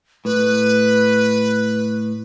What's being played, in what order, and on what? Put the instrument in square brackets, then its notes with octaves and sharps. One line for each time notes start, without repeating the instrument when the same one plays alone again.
[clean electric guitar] A2 [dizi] B4